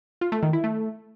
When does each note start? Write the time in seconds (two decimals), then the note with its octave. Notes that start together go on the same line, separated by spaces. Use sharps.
0.21 F4
0.32 A3
0.43 D#3
0.53 E4
0.64 A3